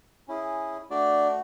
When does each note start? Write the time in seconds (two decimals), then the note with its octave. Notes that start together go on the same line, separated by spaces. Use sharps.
0.28 C#4 E4 G#4
0.90 A3 D4 F#4 D5